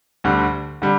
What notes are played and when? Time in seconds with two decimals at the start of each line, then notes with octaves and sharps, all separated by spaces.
0.24 D2 D3 G3
0.82 D3 G3